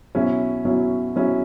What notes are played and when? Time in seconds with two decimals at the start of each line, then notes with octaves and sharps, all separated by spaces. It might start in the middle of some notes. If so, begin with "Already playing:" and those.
0.15 B2 F#3 C#4 E4
0.65 B2 F#3 C#4 E4
1.15 B2 F#3 C#4 E4